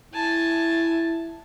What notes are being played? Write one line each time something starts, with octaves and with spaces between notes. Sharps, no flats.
E4 G#5 A5